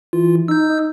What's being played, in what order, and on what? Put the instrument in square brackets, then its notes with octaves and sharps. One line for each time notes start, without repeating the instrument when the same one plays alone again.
[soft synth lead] E3 [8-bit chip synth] F4
[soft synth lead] D#4 [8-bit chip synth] E6 G6
[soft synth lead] D#4